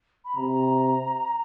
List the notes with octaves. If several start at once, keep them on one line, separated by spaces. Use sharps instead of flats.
B5
C3 A#5